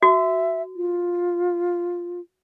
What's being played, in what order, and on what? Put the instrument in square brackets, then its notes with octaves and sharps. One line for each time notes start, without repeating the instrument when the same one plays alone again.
[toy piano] F#4 [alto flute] E5
[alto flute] F4